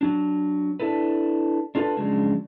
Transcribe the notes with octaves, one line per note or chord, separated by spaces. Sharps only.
F#3 D4
D4 E4 A4 B4
D4 F4 A4 B4
C#3 F3 F#3 G#3 D4